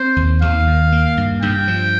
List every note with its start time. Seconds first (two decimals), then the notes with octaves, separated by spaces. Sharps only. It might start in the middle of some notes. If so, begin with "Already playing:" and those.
Already playing: C4 C5
0.16 D#2
0.42 D#2 F5
0.67 D#3
0.92 A#3
1.17 G2
1.42 G2 G5
1.68 F3